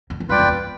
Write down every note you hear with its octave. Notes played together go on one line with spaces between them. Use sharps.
F2
F2
G2 F4 B4 D5 G5
F2
E2